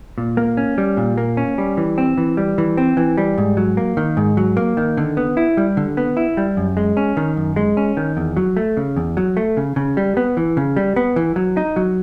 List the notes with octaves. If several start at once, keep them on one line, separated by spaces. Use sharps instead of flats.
A#2
A#3
C#4
G3
A#2
A#3
C#4
G3
E3
C4
E3
G3
E3
C4
E3
G3
G#2
F#3
A#3
D#3
G#2
F#3
A#3
D#3
D3
B3
E4
G3
D3
B3
E4
G3
F#2
G#3
C#4
D#3
F#2
G#3
C#4
D#3
E2
F#3
A3
C#3
E2
F#3
A3
C#3
C#3
G3
B3
E3
C#3
G3
B3
E3
F#3
D#4
F#3